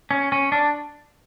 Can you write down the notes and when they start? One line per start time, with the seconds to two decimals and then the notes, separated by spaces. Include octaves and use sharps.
0.11 C#4
0.32 C#4
0.52 D4